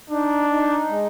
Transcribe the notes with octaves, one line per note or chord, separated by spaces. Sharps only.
D4 D#4
D#4
G#3